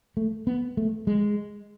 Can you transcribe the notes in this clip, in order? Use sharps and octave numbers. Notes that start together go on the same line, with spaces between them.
A3
B3
A3
G#3